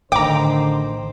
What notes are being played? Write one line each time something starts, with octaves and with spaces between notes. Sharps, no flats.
A1 D3 D#3 C5 G5 A#5 D6